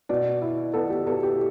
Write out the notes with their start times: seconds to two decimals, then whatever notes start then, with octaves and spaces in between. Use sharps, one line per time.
0.09 B2 D5
0.42 E4
0.74 B3 A4
0.90 G4
1.07 B3 A4
1.23 G4